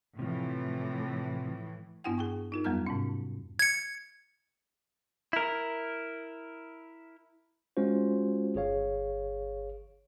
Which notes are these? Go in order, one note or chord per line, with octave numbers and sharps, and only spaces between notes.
A2 C3 E3 F3
G2 B3 D4 E4 F#5 G5
G#4 G5 C#6
D#4 F4 A#4
F2 F#3 G3 B3 A#5 F6
G#2 C3 C#4
G#6 C#7
E4 A#4
G#3 C#4 F4 F#4 C5
G1 G#4 C#5 F5